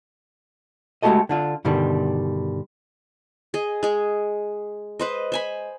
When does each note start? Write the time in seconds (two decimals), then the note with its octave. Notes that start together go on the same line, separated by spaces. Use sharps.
1.02 G#3 A3 F#4 G4 A4 D#5
1.29 D3 D4 F4
1.65 G2 B2 D3 D#3 G3
3.54 G#4 D#5
3.83 G#3 G#4
4.99 B4 C5 D#5
5.32 C5 G#5 B5